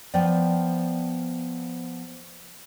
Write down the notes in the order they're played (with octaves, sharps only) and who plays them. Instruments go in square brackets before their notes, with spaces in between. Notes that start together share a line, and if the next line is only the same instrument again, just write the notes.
[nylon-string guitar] F3 B3 D5 G5